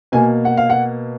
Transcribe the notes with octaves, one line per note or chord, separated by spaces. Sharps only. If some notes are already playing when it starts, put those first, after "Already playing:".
B2 A#3 G#5
F#5
F5
F#5